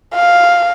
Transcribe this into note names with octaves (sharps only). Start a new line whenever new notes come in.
F5